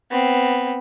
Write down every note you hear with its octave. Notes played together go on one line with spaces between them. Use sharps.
B3 C4